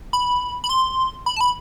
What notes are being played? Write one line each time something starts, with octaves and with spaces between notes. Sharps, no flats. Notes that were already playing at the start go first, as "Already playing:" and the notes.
B5
B5
C6
B5
A5
B5